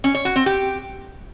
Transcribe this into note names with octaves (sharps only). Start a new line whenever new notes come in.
C#4
C#5
F#4
C4
G4